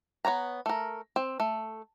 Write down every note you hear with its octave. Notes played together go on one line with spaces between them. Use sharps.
B3 C#5 G#5 A#5
A3 A#4
C4
A3